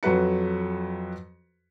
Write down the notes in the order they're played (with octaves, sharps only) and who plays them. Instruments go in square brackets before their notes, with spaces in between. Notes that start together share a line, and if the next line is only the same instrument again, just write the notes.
[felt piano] F2 F#3 F#4 B4 C#7